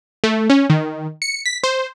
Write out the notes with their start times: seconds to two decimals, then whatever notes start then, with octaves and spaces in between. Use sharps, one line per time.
0.24 A3
0.50 C#4
0.70 D#3
1.22 C#7
1.46 B6
1.64 C5